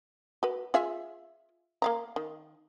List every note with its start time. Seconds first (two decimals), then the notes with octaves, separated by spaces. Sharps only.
0.43 F#4 B4
0.74 F4 G#4 E5
1.82 A#3 F5 A#5
2.16 D#3